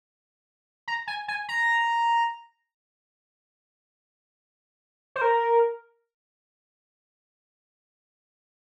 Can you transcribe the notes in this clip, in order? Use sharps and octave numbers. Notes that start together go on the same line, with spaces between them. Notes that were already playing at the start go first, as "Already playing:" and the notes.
A#5
G#5
G#5
A#5
C5
A#4